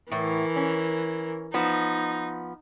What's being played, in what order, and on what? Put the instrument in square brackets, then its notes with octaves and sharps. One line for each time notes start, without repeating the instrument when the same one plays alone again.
[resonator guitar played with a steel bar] A2 [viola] E3 A#4
[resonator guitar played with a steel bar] C#4
[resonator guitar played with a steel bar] F3 B3 [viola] D#4